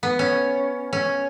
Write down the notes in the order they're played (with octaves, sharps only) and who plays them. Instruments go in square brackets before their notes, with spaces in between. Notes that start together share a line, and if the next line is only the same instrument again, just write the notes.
[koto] B3
C#4
C#4